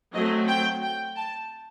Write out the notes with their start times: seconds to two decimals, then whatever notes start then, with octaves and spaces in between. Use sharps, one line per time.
0.13 F#3 A3 C4 D#5
0.48 G5
0.82 G5
1.16 A5